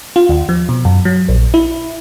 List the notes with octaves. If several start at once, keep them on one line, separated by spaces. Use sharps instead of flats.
F4
D#2
F3
B2
F#2
F#3
A#1
E4